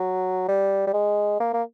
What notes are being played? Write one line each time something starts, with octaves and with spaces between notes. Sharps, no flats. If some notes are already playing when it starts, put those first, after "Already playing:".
Already playing: F#3
G3
G3
G#3
A#3
A#3